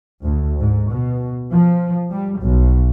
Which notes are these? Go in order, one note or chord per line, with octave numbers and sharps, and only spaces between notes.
D2
G#2
B2
F3
G3
B1